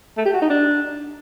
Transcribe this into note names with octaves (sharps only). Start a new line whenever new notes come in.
A3
G4
F#4
D#4
D4